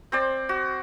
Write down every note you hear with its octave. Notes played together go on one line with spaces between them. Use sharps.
C4 C5 D5
F#4